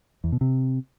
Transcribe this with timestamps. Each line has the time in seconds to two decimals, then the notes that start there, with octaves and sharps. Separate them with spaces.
0.24 E2
0.32 B2
0.41 C3